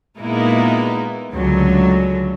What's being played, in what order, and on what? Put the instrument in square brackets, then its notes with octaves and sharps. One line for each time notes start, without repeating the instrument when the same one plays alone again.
[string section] A#2 G#3 A#3 B3 D#4 E4
C#2 D3 F#3 A3